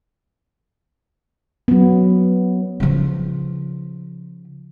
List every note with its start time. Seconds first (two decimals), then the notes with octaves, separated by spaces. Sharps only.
1.68 F#3 B3
2.80 C#3 F3